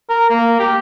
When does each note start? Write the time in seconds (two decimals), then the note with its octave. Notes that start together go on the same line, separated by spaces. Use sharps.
0.10 A#4
0.30 A#3
0.60 G4